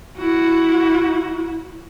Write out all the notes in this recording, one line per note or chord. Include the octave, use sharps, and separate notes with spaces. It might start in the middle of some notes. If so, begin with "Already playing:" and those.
E4 F#4